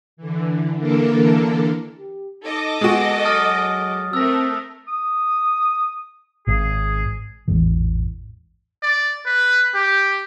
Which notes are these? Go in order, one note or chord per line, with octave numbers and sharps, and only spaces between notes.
D3 E3
D3 E3 A#3 D4 A4 A#4
G4
D#4 A4 D#5 D6
G#3 B3 F#4
F#3 D#6 F6 A6
A3 C4 A#4 E6 A#6
D#6
G#1 G#4
A1 E2 G#2 E3
D5
B4
G4